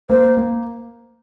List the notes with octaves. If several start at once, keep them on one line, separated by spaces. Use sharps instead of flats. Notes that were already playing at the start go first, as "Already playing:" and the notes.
A#3 C5
A#3